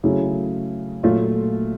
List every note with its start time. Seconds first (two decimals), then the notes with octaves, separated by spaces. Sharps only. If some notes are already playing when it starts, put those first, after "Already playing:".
0.03 C#3 F#3 A3 E4
1.03 A#2 F#3 A3 F4